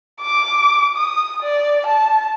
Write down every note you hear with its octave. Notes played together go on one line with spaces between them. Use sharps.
D6
D#6
D5
A5